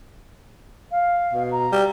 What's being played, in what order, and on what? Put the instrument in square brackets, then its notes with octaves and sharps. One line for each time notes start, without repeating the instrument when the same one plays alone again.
[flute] F5
[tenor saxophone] B2
[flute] A#5
[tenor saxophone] G3